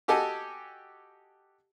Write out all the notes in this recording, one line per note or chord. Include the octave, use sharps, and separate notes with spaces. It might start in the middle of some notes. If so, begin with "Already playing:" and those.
F#4 G4 A4 D#5 G#5